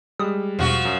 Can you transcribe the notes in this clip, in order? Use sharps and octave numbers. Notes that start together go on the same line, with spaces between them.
G3 G#3 D#6
E2 B2 F3 F#4
F#2